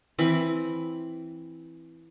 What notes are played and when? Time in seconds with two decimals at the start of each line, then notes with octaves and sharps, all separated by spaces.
0.19 E3 C4 B5